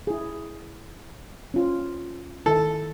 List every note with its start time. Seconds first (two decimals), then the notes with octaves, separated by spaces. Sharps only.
0.07 E4 G#4
1.54 C#4 F4
2.46 D#3 E4 A4